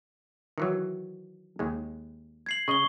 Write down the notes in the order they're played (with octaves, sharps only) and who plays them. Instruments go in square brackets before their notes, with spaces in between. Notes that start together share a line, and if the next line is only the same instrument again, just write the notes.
[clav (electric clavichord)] D#3 E3 F#3
D#2 G#3
[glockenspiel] G#6 C7 F#7
[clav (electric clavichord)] C#3 D#5 [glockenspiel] C#6 G7